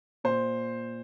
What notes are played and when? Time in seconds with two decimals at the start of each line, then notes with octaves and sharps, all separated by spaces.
0.24 A#2 C5